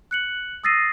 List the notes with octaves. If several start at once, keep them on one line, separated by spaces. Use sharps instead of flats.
F#6 C#7 F#7
D#6 E6 A6 A#6 C7 D#7